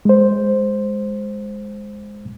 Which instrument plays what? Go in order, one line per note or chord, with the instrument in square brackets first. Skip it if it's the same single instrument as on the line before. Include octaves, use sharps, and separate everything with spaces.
[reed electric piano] G#3 C5